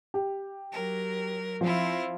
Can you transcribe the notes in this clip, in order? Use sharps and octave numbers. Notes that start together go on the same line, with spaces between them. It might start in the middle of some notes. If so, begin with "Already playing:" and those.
G4
F#3 A#4
F3 C4 E4 F4